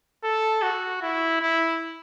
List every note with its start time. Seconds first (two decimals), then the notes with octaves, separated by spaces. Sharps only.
0.24 A4
0.62 F#4
1.03 E4
1.41 E4